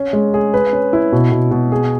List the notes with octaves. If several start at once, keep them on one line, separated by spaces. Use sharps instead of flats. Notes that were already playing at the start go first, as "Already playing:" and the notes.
Already playing: C#4
G#3
G#4
B4
C#4
E4
B2
B2
B2
G#4